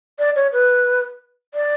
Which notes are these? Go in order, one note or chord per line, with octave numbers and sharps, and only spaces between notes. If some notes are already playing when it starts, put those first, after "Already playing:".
D5
C#5
B4
D5